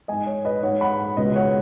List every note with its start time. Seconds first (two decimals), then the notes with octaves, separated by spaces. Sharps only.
0.08 G#2 G#3 D#5 G#5
0.27 C#5
0.45 B4 D#5
0.63 G#2 G#3 C#5 F#5
0.81 F#5 B5
1.17 C#2 B2 G#3 B4 D#5
1.35 C#5 F#5